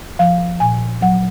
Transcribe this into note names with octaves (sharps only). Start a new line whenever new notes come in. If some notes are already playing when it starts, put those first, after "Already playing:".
F3 F5
A#2 G#5
F#3 F#5